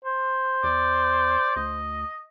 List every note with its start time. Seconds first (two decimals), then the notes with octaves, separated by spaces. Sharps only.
0.04 C5
0.64 E2 D5
1.56 D2 D#5